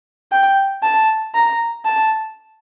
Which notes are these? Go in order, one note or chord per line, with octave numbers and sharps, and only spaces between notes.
G5
A5
A#5
A5